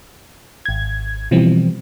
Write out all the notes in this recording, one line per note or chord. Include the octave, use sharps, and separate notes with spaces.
G#1 G#6
B2 E3 F3 G3 C4